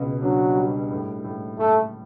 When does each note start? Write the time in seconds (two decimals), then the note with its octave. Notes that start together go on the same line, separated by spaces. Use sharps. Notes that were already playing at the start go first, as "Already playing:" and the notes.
Already playing: C#2 B2
0.22 F#3 D4
0.56 G3
0.90 A2
1.24 A2
1.58 A2 A3